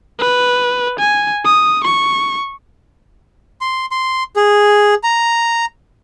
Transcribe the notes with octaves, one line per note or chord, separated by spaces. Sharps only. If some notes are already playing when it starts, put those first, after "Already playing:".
B4
G#5
D#6
C#6
C6
C6
G#4
A#5